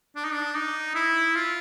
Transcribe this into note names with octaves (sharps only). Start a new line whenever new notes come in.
D4
D#4
D4
D#4
E4
F4